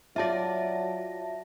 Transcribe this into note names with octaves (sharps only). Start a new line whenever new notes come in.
F#3 F4 D5 E5 A5 A#6